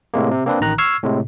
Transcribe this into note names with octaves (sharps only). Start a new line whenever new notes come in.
A2 C3 G#3 A#3
C3
A#3 C4 D4 B4
A1 D#3 A#5 F#6
C#6 E6 F6 G#6 C7
A2 C3 G#3